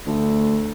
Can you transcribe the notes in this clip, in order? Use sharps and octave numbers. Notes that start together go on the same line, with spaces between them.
D2